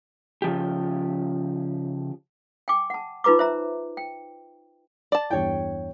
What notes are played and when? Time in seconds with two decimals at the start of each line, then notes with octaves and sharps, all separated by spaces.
0.42 C#3 F3 G4
2.68 G5 G#5 D6
2.90 F#5 A5
3.24 D#4 F4 B4 A#5 D6
3.39 C5 E5 A#5
3.97 G5
5.12 D5 A5
5.30 E2 G2 E4 C#5 G5